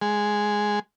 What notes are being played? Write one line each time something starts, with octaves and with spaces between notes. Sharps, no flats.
G#3